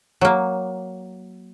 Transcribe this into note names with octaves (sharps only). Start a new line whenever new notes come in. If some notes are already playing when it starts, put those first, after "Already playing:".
F#3 A#3